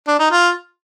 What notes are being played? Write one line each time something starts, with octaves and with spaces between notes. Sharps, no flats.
D4
D#4
F4